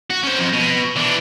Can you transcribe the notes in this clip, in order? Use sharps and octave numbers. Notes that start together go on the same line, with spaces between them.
F#4
C#4 C5
F2
B2
E3 D4